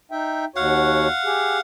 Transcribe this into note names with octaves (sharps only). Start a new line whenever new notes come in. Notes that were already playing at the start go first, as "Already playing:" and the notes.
D#4 E5 G5
D#2 F#4 C#5 F5 F#5
G4 G#4